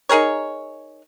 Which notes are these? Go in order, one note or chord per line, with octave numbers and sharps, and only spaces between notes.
D#4 G#4 A#4 C#5